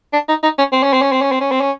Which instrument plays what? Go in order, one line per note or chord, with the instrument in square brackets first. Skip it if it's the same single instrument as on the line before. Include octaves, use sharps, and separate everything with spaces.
[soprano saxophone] D4
D#4
D#4
C#4
C4
C#4
C4
C#4
C4
C#4
C4
C#4
C4
C#4